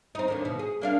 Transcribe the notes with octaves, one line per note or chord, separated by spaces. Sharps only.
C4 D#4
D#2 D3 D#3
B2
G#4
A#3 D4 F5